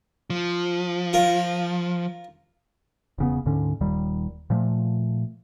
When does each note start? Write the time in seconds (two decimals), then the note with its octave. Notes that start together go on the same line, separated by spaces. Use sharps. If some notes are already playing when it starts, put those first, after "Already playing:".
0.30 F3
1.13 F4 A#4
3.18 E1 C#3 B3
3.46 D2 G#2 D3 C#4
3.81 D#1 D#2 D#3 G3
4.50 A#2 F3 A3